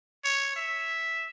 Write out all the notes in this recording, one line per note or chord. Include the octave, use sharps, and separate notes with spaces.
C#5
E5